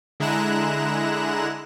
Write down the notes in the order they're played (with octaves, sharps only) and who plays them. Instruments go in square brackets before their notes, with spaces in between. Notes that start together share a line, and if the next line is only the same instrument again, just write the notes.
[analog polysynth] D3 G#3 E4 A#5 F#6 E7